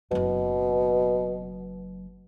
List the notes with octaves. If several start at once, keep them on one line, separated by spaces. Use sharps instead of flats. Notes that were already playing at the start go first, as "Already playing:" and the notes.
F#1 B2 F#3